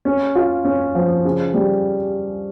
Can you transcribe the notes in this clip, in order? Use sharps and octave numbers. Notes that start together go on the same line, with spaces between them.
C#4
F4
C#4
F3
C#3
G3